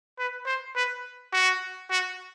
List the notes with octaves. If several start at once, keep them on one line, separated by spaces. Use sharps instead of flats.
B4
C5
B4
F#4
F#4